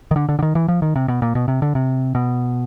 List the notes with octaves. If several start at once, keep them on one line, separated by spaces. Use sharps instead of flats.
D#3
D3
D3
D3
D#3
E3
F3
D#3
C3
B2
A#2
B2
C3
D3
C3
B2